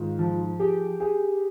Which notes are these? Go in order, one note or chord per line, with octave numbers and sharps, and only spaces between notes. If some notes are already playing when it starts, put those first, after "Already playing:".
Already playing: G#2 D#3 F4
F3
G4 G#4
G4 G#4